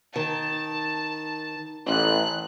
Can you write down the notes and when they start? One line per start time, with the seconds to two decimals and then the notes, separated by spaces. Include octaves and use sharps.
0.16 D#3 A5
1.87 A1 F#6